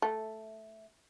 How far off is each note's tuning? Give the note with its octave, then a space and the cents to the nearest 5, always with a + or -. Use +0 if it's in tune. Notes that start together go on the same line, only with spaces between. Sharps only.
A3 -5